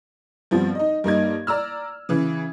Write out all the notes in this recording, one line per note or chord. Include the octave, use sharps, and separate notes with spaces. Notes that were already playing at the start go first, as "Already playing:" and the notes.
G2 F3 B3 C4
D#4 D#5
G2 A#3 D#4 G#6
D5 A#5 E6 F6
C#3 E3